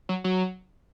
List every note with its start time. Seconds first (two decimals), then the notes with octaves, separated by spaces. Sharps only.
0.09 F#3
0.24 F#3